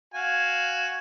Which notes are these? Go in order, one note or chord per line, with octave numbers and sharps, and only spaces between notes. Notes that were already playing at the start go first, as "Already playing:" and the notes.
F#4 F5 G#5